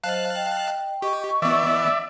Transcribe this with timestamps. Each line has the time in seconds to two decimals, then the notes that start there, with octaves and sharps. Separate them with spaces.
0.04 F#3 C5 D#5 F5 A5 F#6
0.35 D#5 G5
1.02 G4 D#5 C#6
1.42 E3 B3 D5 E5